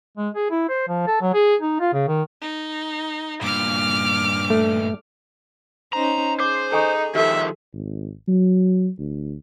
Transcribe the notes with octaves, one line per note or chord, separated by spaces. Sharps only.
G#3
G#4
E4
C5
F3
A4
F#3
G#4
D#4
F4
C#3
D#3
D#4
G2 A#2 D6 F6
A3
C#4 D#4 C5 A#5
G#4 C5 D6
D#4 A4 G#5 C#6
D#3 F3 G4 A4 E5
G#1
F#3
D2